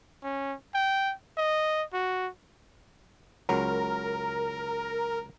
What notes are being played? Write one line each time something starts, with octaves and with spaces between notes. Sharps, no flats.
C#4
G5
D#5
F#4
C#2 F#3 A#4